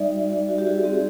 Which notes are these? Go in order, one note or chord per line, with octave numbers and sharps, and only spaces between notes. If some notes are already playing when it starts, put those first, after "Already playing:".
Already playing: G3 D#4 D5 E5
F#4
D#4
F#4
G4
F#4 G#4
C4 G4
G#4